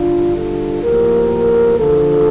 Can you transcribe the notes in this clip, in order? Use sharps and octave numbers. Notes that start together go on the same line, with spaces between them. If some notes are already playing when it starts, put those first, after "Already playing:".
Already playing: G2 D3 G3 D4 F4
F4 A4
A2 F3 A#3 G4 A#4
E2 D3 F3 F4 A4